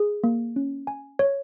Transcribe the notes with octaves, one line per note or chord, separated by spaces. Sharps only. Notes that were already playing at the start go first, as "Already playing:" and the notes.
Already playing: G#4
A#3
C#4
G#5
C#5